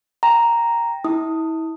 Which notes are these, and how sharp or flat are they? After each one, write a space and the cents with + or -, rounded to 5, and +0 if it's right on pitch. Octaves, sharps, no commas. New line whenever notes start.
G5 +5 A#5 +0
E4 -35 D#6 +0